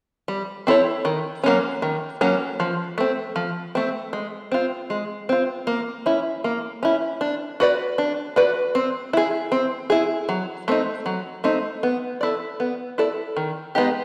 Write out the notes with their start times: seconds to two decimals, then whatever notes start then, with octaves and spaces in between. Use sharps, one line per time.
0.28 G3
0.67 C4 E4 A4 C#5
1.05 D#3
1.43 F#3 A#3 C#4
1.82 D#3
2.21 F#3 A#3 C#4
2.60 F3
2.98 A3 C4
3.36 F3
3.75 A3 C4
4.13 G#3
4.52 C4 F4
4.90 G#3
5.29 C4 F4
5.67 A#3
6.06 C#4 E4
6.44 A#3
6.83 C#4 E4
7.21 D4
7.60 F#4 B4 D5
7.98 D4
8.36 F#4 B4 D5
8.75 C4
9.13 E4 G#4
9.52 C4
9.90 E4 G#4
10.29 F#3
10.68 A3 C4 D#4
11.06 F#3
11.44 A3 C4 D#4
11.83 B3
12.21 E4 A4 D5
12.60 B3
12.98 E4 A4 D5
13.37 D#3
13.75 G#3 B3 D#4 G4